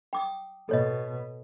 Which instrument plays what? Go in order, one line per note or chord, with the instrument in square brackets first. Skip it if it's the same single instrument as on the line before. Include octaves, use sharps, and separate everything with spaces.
[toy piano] G5 D6 D#6
[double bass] B2 [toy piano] A4 C#5 D#5